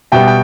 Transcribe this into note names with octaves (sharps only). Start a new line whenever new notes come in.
B2 G3 B3 E5 G5
G5